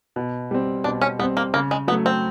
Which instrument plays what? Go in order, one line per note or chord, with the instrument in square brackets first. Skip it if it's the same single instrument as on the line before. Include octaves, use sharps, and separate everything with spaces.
[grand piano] B2
G3 C4
[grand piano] B2 [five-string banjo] D4
[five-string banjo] C#4
[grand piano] G3 [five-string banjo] B3
[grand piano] C4
[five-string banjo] A#3
[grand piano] C#3 [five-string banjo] A#3
[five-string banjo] G#3
[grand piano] F#3 [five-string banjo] B3
[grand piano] A3
[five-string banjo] C4